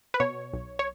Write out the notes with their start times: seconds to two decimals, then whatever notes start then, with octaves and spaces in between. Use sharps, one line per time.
0.14 B4
0.20 B2 C#5
0.53 B1
0.79 C#5